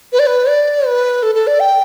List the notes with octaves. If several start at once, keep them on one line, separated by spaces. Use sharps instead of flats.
B4
D5
B4
D5
B4
A4
A4
D5
G5